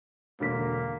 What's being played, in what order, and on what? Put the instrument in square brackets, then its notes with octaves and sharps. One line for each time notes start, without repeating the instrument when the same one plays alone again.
[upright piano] E1 D3 B6 [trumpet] A#3